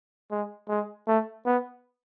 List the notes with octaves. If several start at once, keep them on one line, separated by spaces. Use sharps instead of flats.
G#3
G#3
A3
B3